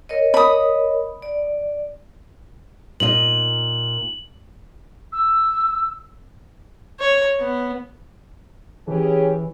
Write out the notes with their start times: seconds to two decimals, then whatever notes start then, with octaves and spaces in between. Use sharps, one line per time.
0.09 A#4 C#5 D#5
0.34 B5 D#6
1.22 D5
3.00 A#2 D#4 D#5 F#7
5.12 E6
6.99 C#5
7.40 B3
8.87 E3 C#4 G4 G#4